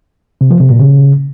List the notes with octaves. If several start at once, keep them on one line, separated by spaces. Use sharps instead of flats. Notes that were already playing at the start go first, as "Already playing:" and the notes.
C3
F3
C3
A#2
C#3